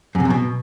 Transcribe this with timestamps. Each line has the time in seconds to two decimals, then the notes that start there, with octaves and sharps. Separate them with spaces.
0.15 F#2
0.20 C3
0.25 F#2
0.30 B2